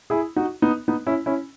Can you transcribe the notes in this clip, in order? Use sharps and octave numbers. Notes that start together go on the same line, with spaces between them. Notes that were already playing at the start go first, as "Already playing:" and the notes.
E4 G#4
D#4 F#4
B3 D#4
B3 D#4
C#4 E4
C#4 E4